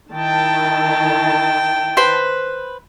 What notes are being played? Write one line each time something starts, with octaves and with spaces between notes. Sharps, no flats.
D#3 E4 G5 A5
B4 C5 B5